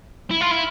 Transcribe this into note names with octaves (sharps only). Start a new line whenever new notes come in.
E4
F4
E4